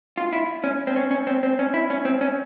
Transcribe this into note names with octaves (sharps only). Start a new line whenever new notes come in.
F4
E4
C#4
C4
C#4
C#4
C4
C4
C#4
E4
C#4
C4
C#4